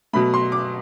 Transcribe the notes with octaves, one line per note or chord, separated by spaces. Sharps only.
B2 F#3 A3 B5
C6
D6